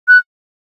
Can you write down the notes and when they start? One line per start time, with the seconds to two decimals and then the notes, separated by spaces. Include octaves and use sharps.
0.08 F#6